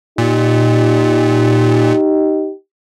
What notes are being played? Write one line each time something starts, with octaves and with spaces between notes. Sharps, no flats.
A#2 D#4 G4